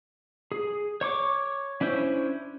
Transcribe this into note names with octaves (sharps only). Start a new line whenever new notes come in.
G#4
C#5 C#6 D6
C#4 D4 E4 C5 C#5